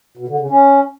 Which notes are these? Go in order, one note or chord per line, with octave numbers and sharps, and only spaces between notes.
B2
D3
C#3
C#4